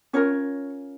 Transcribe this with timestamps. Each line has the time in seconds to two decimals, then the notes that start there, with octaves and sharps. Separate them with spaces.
0.13 C#4 F4 A#4 C#5